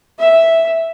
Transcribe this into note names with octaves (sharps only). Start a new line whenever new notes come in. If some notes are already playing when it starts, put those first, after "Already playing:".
E5